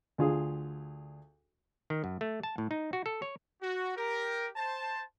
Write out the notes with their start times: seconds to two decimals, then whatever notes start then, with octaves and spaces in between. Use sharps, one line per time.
0.18 D2 F4 G#4
1.90 D#3
2.04 F#2
2.21 A3
2.43 A5
2.58 A2
2.71 D#4
2.93 F#4
3.06 A4
3.22 C#5
3.61 F#4
3.96 G4 A#4
4.56 C5 A5